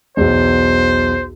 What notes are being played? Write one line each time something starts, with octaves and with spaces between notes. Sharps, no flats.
B1 E2 C5